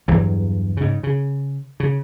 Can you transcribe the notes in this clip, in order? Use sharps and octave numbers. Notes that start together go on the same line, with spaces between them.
E2 G2 E3 F#3
G#2 C#3
C#3
C#3